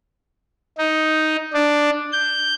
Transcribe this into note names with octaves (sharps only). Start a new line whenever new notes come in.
D#4
D4
G6